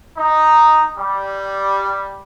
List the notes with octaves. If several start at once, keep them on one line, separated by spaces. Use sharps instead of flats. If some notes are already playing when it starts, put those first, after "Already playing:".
D#4
G3